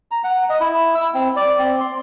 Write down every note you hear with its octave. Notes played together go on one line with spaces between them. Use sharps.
A#5
F#5
D#5
E4
E6
C4
D5
C4
C6